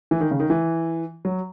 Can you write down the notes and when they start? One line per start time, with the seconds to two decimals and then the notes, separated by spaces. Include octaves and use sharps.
0.11 E3
0.21 D#3
0.31 C#3
0.40 D#3
0.50 E3
1.25 F#3